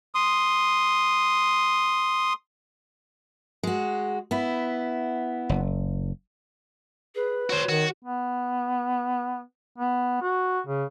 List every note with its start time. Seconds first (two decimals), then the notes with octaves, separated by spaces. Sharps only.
0.15 C6 D#6
3.63 G#3 F#4
4.31 B3 E4
5.49 F#1
7.15 G#4 B4
7.50 F#4 C5 C#5
7.69 D#3 F#4
8.05 B3
9.78 B3
10.22 F#4
10.67 C#3